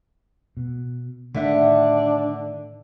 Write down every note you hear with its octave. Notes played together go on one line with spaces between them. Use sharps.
B2
A2 D3 D#3 D4 E5 F#5